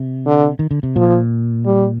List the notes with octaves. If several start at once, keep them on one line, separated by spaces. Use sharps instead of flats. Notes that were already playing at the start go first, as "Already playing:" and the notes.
Already playing: C3
D3
D#3
D3
C3
A#2 F3
G3